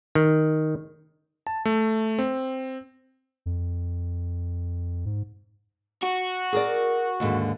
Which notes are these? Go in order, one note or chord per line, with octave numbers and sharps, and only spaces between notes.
D#3
A5
A3
C4
F2
G#2
F#4
G#4 A#4 D5
D#2 G#2 D3